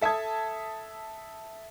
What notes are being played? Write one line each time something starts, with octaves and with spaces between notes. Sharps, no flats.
A4 E5 A5 D#6 G#6